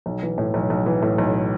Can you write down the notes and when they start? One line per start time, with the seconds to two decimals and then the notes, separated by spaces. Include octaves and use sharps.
0.06 B1
0.23 E3
0.38 A2
0.54 B1
0.70 B1
0.86 E3
1.02 A2
1.18 B1